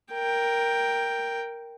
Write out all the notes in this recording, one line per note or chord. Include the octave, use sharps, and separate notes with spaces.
A#4 G5